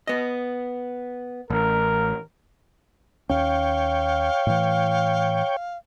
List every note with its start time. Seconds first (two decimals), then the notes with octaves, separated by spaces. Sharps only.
0.07 B3 D#5
1.50 A1 A#4
3.29 D#2 C#4 C#5 F5 G5
4.47 A2 E3